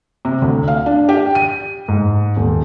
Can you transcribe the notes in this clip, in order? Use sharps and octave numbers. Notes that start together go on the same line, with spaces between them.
C3
D2
F5
D4
G4
D#7
G#2
D#1